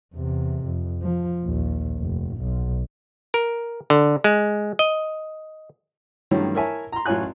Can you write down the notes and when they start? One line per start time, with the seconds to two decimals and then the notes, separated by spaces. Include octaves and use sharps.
0.14 E2 C3
0.64 F2
1.02 F3
1.44 A#1 D#2
1.99 F1
2.37 B1
3.34 A#4
3.90 D3
4.24 G#3
4.79 D#5
6.31 G2 D#3 E3 F#3 A3 C#4
6.55 E4 A#4 C#5 E5 G#5 A5
6.92 A#5 C6
7.06 A1 F#2 F4 C#5 G#5 F#6